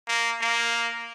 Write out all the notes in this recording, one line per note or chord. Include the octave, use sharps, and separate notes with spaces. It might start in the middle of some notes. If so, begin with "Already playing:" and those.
A#3
A#3